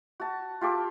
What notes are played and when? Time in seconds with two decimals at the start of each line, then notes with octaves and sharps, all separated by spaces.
0.20 F#4 A5
0.61 F4 G4 A4 D6